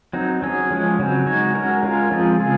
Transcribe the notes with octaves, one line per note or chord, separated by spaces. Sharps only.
F#3 C4 D#4
F#3 C#4 G#4
F3 G#3 C#4
C#3 F#3 C4
G#3 D#4 F#4 C#5
G#3 C#4 F#4 A#4
G#3 C#4 F4 A#4
F3 G#3 C4 F4 G#4
C#3 G#3 C4 F4 G#4